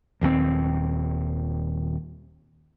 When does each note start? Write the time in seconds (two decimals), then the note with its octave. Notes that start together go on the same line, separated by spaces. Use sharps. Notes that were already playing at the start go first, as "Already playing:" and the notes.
0.21 D#1 D#2 F3 C4